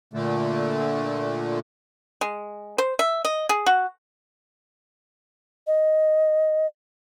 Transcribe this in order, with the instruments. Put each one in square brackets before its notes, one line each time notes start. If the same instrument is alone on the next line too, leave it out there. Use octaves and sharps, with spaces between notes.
[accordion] A#2 D3 A3
[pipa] G#3
C5
E5
D#5
G#4
F#4
[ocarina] D#5